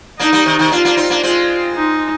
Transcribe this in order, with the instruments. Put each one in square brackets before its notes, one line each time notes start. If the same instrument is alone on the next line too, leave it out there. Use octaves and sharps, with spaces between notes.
[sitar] A#3 D4 [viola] D#4
[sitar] G3 A#3
C3 D#3
C3 D#3
[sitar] A#3 D4 [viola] F4
[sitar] A#3 D4
C4 D#4
A#3 D4
[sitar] G#3 C4 [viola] F4
[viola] D#4